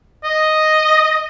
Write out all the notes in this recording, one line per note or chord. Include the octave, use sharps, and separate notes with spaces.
D#5